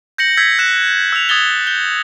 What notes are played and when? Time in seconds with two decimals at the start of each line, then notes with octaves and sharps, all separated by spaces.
0.18 G6 A#6 C#7 F#7
0.37 E6 G6 G#6 B6
0.59 F#6 E7
1.12 E6 F7
1.29 D#6 G#6 A6 G7
1.67 G6 G7